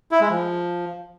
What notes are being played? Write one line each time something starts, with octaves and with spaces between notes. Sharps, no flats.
E4
G#3
F3